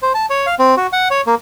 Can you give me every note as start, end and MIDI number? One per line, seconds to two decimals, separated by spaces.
0.02 0.13 72
0.14 0.26 81
0.30 0.46 73
0.47 0.55 77
0.59 0.75 60
0.77 0.87 66
0.93 1.08 78
1.11 1.21 73
1.27 1.35 58